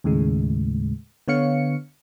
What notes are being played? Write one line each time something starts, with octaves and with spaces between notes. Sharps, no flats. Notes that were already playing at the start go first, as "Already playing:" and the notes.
D#2 A2 C#3 G#3
D3 B3 C#5 F5 C#7